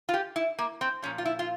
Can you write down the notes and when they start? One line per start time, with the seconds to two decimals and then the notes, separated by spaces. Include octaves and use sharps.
0.09 F4
0.14 G4
0.36 E4
0.59 A#3
0.81 C4
1.02 A#2 F3 C#4
1.18 F4
1.25 E4
1.39 F4